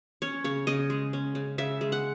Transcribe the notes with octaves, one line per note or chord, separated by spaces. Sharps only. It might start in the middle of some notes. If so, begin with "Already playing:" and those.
C#4 C#5
C#3 C#5
C#3 D#5
G#3
C#4
C#3
C#3 E5
G#3
F#5